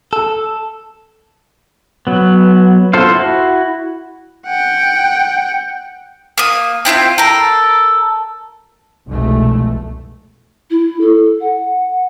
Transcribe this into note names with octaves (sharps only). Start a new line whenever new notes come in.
A4
F#3 B3
F4 A4 C5 F5
E4 F#4
F#5 G5
A#3 D#6
C4 E4 F4 G5
A4 A#4
F1 C2 B2 G#3 A3
E4
A4
F#5